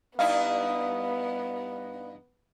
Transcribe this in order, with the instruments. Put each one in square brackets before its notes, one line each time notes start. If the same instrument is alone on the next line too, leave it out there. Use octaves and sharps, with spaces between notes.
[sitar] G2 D#4 E4 [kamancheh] B3 [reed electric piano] F5